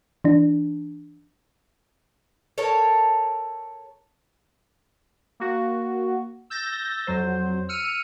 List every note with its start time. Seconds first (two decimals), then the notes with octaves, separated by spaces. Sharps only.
0.24 E3 D4
2.58 A4 A#4 C#5
5.40 A#3 F#4
6.50 E6 G6 A6 A#6
7.07 F2 F#3 C5
7.69 E6 F6 C#7 D#7